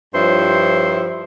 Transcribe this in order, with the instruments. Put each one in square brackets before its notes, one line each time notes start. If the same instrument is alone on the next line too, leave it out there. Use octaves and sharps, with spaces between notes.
[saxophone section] G2 F3 E4 C5 C#5